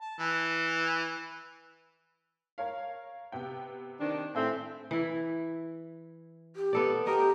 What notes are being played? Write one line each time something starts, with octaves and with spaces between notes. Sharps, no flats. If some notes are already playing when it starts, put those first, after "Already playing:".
A5
E3
A#4 C#5 F5
C3 B3 G5
D#3 C4 D4
A2 C4 A4 E5 G#5
E3 E4
G4
B3 A4 D5
G4 A#4 D#5